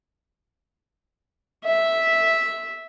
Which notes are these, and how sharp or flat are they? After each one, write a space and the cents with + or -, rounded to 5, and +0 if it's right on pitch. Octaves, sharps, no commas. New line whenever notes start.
E5 -5